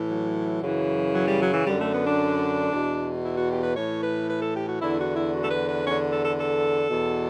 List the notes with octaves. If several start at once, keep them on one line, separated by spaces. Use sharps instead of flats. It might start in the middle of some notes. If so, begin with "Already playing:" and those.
Already playing: A2 E3
F#3
F#2 C#3 E3
F#3
G3
F#3
E3
F#2 D3 G3
A3
B3
D4
E2 B2
E4
F#4
G4
B4
A2 E3 C#5
B4
B4
A4
G4
F#4
E2 D3 E4
F#4
E4
F#4
A4
B4
B4
E2 D3 C#5
A4
A4
A4
E2 B2